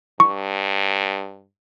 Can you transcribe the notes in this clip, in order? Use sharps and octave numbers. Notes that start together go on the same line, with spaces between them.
G2 C#6